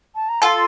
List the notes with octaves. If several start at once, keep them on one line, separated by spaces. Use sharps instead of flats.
A5
A#5
F4 A4 C6